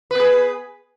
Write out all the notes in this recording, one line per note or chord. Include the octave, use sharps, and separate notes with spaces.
B3 G#4 B4